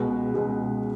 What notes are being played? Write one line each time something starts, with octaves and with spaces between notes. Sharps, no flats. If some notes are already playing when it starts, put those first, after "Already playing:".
Already playing: C#2 B2 G#3 B4
C#2 B2 G#3